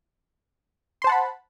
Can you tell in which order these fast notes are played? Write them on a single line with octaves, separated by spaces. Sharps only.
C6 C5 A5 F#5 B5